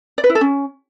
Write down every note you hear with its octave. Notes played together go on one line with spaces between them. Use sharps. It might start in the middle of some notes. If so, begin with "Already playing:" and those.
D5
B4
E4
A4
C#4